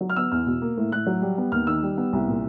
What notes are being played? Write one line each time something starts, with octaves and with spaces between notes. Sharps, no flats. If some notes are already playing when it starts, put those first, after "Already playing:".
F#3
F6
B3 E6
E2 F6
B2
A#3
A2
A2 F#6
F#3
G3
B3
D#2 F6
D#3 E6
G3
B3
C2
A#2